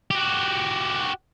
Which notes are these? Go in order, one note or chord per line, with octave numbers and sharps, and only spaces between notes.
F#4 G4